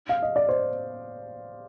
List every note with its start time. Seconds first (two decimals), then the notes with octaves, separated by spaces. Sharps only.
0.09 F5
0.22 D#5
0.36 D5
0.49 C5